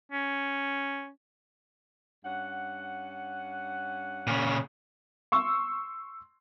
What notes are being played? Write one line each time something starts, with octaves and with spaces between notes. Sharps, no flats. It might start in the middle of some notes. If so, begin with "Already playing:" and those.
C#4
G2 C#4 F#5
A#2 C#3
C6 C#6 E6